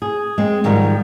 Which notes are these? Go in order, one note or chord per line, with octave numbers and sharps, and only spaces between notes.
G#4
G#3 C4
G#2 D#3 F3 G3